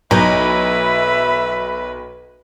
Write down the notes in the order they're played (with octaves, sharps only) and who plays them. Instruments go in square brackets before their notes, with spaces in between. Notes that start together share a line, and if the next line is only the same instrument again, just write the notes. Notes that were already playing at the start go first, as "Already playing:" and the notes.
[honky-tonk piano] B1 [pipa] E3 D#4 [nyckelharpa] B4 [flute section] E5 B5